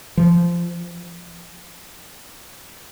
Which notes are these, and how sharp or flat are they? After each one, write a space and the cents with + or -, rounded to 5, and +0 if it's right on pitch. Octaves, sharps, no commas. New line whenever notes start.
F3 -15